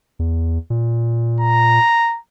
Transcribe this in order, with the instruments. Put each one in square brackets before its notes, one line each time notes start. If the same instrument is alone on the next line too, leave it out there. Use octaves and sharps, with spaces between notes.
[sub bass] E2
A#2
[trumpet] A#5